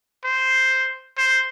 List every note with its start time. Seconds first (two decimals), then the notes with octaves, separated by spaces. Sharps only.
0.25 C5
1.18 C5